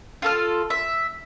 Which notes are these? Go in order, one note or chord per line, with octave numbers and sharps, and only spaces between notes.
F4 A4 F6
E5